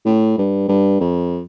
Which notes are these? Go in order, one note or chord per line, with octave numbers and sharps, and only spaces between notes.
A2
G2
G2
F2